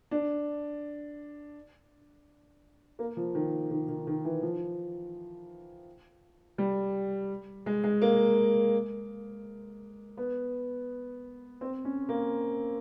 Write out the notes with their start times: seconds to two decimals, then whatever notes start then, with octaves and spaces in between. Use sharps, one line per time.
0.11 D4
2.99 A#3
3.17 F3
3.35 D#3
3.71 D#3
3.89 D#3
4.07 D#3
4.25 E3
4.42 F3
6.58 G3
7.66 G#3
7.84 G#3
8.02 A#3
10.17 B3
11.61 C4
11.85 C#4
12.09 A#3